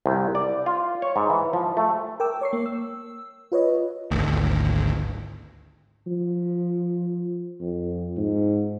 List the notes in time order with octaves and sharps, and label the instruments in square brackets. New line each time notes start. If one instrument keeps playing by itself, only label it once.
[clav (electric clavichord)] C2
D5
F4
C#5
G#2
E3
F3
A3
[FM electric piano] A#4 G5 D6 E6
C#5 C#6 C7
A#3
E6
F4 B4 C#5 D#5
[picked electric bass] G#1 D2
[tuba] F3
F2
G#2